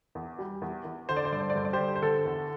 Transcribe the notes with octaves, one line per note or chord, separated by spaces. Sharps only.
E2
G3
E2
E2
D3 C5
D5
C5
G2 D5
C5
D5
G2 C5
D5
G4 C5
D3
C5
D3 A4
E2